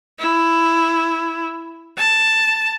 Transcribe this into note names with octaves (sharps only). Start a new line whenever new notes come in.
E4
A5